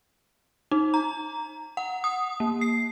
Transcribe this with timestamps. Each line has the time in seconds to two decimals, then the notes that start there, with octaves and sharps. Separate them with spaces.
0.71 D#4
0.94 A#5
1.77 F#5
2.04 D#6
2.40 A#3
2.61 C7